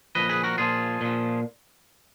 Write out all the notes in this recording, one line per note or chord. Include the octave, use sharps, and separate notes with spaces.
A#2 F3 B4 D#5
G#4 B4
F#4 A#4
A#2 F3 F4 G#4
A#2 F3